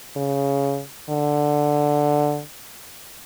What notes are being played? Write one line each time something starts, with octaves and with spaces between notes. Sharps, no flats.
C#3
D3